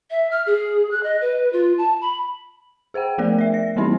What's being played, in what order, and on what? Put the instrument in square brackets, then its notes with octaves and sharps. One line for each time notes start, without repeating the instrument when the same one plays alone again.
[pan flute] E5
F6
G#4
F#6
D#5
B4
F4
A5
B5
[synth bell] G#4 C5 F#5 G5
F3 A3 B3 A#4 D5
D5 E5
A#6
E3 G3 A#3 C4 D#4 E4